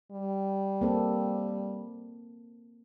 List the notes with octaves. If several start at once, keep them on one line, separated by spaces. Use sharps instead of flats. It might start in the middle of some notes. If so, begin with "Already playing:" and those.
G3
A#3 C4 A4